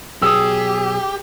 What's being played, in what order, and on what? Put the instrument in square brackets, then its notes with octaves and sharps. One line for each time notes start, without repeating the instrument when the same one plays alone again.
[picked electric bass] B2 F#3 [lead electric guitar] G4 [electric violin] G#4 [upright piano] D#6 E6